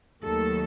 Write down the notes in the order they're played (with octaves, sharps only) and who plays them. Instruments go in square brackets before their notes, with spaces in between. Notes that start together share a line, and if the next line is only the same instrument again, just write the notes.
[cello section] D#2 D#3 F#3 A3 A4